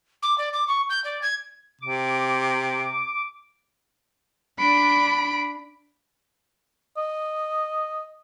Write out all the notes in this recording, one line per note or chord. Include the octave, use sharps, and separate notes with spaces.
D6
D5
D6
C#6
G6
D5
G#6
C3 D6
D4 B5 D7
D#5